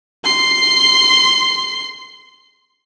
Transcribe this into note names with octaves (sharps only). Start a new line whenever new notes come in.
C6 C7